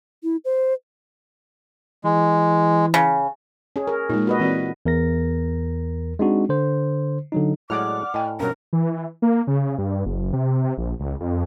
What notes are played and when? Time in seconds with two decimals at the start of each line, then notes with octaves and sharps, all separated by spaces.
0.23 E4
0.45 C5
2.04 E3 G#3
2.94 C#3
3.76 C#4 G#4
3.87 G#4 A#4
4.10 A#2 G#3 D#4
4.27 F#4 B4 D#5
4.40 E3 C4 F#4 D5
4.86 E2 A#4 A#6
6.19 G#3 C4 D4 D#4 F#4
6.49 D3 C5
7.32 D3 F#3 D#4
7.70 A2 F#3 G#3 D5 F#5 D6 F6
8.14 A2 D#5 G5 G#5
8.40 G2 B2 F3 F#3 C#4 A#4
8.73 E3
9.22 A#3
9.47 C#3
9.78 G2
10.06 F#1
10.33 C3
10.64 C3
10.78 A#1
10.99 C#2
11.20 F2